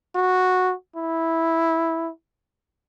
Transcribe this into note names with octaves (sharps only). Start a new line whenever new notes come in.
F#4
E4